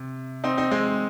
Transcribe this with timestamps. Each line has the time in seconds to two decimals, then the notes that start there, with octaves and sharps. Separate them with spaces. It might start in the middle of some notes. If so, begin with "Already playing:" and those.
Already playing: C3
0.44 C4 D#4
0.57 C4 D#4
0.71 G#3 C4